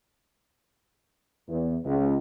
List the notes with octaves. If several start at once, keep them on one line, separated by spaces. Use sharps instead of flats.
E2
C#2